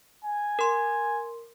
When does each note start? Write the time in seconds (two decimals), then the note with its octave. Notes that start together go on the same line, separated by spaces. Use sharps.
0.24 G#5
0.59 A#4 C6